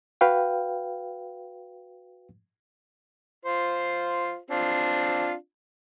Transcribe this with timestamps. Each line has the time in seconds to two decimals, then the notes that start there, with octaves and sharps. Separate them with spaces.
0.21 F#4 B4 F5 G5
3.45 F4 C5
4.51 C4 D4 F4